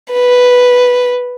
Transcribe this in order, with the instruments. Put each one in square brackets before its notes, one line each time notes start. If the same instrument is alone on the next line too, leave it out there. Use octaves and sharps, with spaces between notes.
[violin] B4